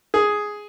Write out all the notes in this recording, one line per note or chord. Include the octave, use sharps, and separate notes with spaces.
G#4